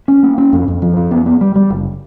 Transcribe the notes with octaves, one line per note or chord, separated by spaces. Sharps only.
C#4
A#3
C#4
F2
F2
F3
F2
B3
B3
G3
G3
F#1